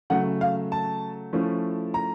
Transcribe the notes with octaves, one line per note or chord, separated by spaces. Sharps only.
C#3 F#3 A3 F#5
F5
A5
F3 A3 C#4 E4
A#5